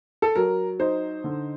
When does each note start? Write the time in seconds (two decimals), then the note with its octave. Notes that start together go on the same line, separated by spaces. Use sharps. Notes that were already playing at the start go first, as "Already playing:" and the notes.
0.22 A4
0.35 F#3 A#4
0.80 D#4 C5
1.24 D3